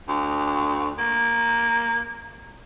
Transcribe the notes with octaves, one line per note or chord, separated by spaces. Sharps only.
D2
A#3